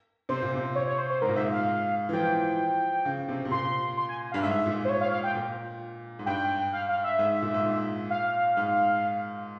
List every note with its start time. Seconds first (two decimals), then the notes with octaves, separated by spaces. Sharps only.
0.29 C3 C5
0.42 A#2
0.54 C3
0.75 C#5
0.87 C#5
0.98 C5
1.10 C5
1.22 G#2 A#4
1.29 A#2
1.36 G#2 E5
1.52 F5
2.09 E3
2.13 F3 G5
3.05 C#3
3.29 C3
3.45 C3
3.51 A#2 C6
3.97 C6
4.09 G#5
4.32 G2 F5
4.42 G#2 E5
4.66 A#2
4.85 C5
4.89 C#5
5.01 F5
5.11 F5
5.24 G5
5.35 A#2
6.19 G#2
6.26 G2 G5
6.73 F5
6.89 F5
7.04 E5
7.19 G#2
7.42 A#2
7.54 G#2
7.65 A#2
8.10 F5
8.57 G#2